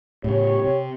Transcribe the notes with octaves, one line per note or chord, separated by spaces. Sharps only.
A2 C#3 G4 C#5
C3